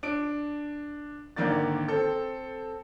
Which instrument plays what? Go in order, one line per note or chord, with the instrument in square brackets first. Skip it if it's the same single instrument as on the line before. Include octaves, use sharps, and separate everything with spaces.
[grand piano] D4 D7
G#1 D3 D#3 A#3 D5 A6
C4 A4